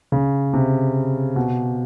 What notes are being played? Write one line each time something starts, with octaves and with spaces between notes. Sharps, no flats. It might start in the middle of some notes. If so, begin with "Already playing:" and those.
C#3
C3
B2